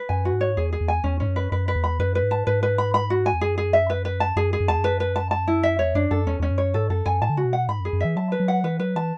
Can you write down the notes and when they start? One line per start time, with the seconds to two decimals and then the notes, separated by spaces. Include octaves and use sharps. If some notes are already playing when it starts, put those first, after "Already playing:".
Already playing: B4
0.09 F#2 G#5
0.25 F#4
0.33 G#2
0.41 C#5
0.57 E2 G#4
0.73 G#4
0.81 E2
0.88 G#5
1.04 E2 C#4
1.20 G#2 C#4
1.28 F#2
1.36 B4
1.52 F#2 B4
1.68 B4
1.76 E2
1.84 B5
1.99 F#2 B4
2.15 B4
2.23 G#2
2.31 A5
2.47 G#2 B4
2.63 B4
2.78 B5
2.94 B5
3.10 F#4
3.26 G#5
3.33 E2
3.41 F#2 G#4
3.58 G#4
3.73 E5
3.90 B4
4.05 B4
4.20 A5
4.36 F#2 G#4
4.53 G#4
4.60 F#2
4.68 E2 A5
4.78 F#2
4.84 B4
5.00 B4
5.16 A5
5.31 A5
5.48 E4
5.63 E5
5.79 E2 C#5
5.95 F#2 D4
6.11 F#2 A4
6.26 E2 C#4
6.39 E2 C#4
6.50 F#2
6.58 C#5
6.74 G#2 A4
6.90 F#2 A4
7.06 F#2 G#5
7.22 A2 A5
7.30 D3
7.37 C#3 F#4
7.45 B2
7.53 F#5
7.68 G#2 B5
7.80 F#2
7.85 G#4
7.93 F#2
8.00 E3 E5
8.16 F#3 A5
8.32 B4
8.40 F#3
8.48 F#5
8.64 E3 B4
8.80 F#3 B4
8.96 E3 A5